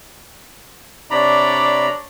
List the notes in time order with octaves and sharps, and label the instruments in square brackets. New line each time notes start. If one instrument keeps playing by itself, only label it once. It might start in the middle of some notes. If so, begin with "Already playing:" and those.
[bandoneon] C3 A#5 B5 [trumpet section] D4 C#5 D5